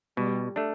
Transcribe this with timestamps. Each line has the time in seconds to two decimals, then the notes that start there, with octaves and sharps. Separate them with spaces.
0.17 B2 G3
0.56 A3 D4